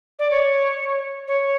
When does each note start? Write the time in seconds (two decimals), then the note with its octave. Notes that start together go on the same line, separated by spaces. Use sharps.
0.19 D5
0.31 C#5
1.28 C#5